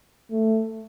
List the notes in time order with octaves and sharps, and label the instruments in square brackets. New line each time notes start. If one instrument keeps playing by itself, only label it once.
[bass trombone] A3